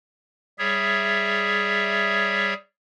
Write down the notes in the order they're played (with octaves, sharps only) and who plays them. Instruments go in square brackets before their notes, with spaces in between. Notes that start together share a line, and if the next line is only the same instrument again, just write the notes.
[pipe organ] G3 G#4 C#5 E5